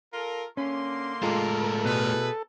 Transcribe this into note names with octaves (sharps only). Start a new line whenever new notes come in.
F4 A4 A#4
D3 A#3 C#4 C6
A2 G#3 F4 A4 A#4
B2 A3 G#4 B4